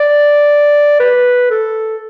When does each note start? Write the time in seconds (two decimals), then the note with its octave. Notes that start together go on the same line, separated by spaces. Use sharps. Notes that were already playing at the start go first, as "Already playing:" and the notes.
Already playing: D5
1.00 B4
1.50 A4